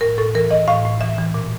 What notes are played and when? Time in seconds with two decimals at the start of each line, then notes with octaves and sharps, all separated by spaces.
0.01 A2 A#4
0.18 A2 A4
0.35 E3 A#4
0.51 E3 D#5
0.68 A2 F5
0.85 A2
1.01 E3 E5
1.18 E3
1.34 A#2